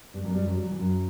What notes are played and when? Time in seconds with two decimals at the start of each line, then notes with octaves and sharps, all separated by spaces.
0.14 G2 G3
0.24 F#2 F#3
0.30 A#3
0.34 G2 G3
0.44 F#2 F#3
0.55 G3
0.63 F#3
0.71 E3
0.78 F#2 F#3